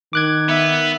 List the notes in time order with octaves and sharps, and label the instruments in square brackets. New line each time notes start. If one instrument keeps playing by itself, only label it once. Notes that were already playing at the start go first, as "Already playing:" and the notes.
[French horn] D#3 [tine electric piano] D6 F#6 G#6
[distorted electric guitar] B3 [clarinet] E5